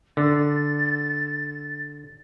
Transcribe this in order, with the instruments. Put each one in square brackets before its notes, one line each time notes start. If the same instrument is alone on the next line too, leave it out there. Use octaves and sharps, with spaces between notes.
[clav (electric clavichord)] D3 [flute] A6